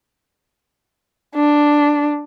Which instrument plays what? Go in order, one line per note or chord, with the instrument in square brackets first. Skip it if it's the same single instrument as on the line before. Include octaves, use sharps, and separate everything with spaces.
[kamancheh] D4